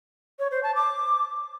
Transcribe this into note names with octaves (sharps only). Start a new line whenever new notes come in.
C#5
C5
A5
D6